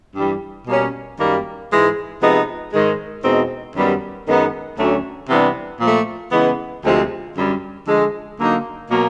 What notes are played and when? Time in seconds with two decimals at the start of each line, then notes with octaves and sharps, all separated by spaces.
0.16 G2 E3 G3
0.67 B2 G3 A#3 C#4
1.19 F#2 D#3 G3 A#3
1.70 G#2 E3 G#3
2.21 C3 F3 G#3 B3 D#4
2.73 G#2 D#3 G#3
3.24 E2 B2 G#3 C4 D#4
3.75 F#2 D#3 G3 B3
4.27 F#2 D#3 G#3 B3 D#4
4.79 D2 D3 F#3 A3 C#4
5.30 C3 E3 G3 B3 D4
5.81 A#2 F3 A3
6.32 C#3 E3 G#3 B3
6.84 D2 C3 F3 G#3 C4
7.35 F#2 D3 G3
7.86 D3 F3 G#3
8.38 D3 F#3 A#3 D#4
8.89 B2 F#3 A#3